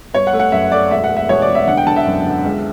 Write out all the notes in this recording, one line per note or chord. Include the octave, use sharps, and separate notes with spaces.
G1 C#5
F#5
A3
F#5
F#2 E5
A3 D5
E1 E5
F#5
A3
E5
E1 C#5
D5
E1
E5
D3 F#5
G5
D3 A5
E5
F#2
D3
C#2